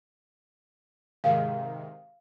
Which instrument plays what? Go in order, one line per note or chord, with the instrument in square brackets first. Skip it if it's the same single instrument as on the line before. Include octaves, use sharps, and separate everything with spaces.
[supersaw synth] G#2 C3 D#3 [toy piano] F5